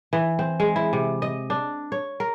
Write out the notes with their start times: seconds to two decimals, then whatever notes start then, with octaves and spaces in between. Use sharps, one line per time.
0.13 E3
0.39 C4
0.60 G#3
0.76 E4
0.93 C3
1.22 D#5
1.50 D4
1.92 C#5
2.20 A#4